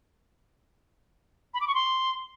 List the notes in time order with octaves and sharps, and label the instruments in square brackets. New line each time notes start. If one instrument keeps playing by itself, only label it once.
[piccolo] B5
D6
C#6
C6